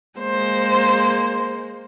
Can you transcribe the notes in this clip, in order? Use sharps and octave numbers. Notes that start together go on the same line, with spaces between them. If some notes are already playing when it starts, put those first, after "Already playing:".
G#3 A#3 C5